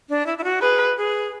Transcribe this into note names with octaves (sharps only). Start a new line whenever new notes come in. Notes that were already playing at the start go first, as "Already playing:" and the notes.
D4
E4
E4
F#4
G#4 B4
G#4